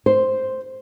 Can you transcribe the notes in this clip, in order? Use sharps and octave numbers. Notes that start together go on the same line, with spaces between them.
C5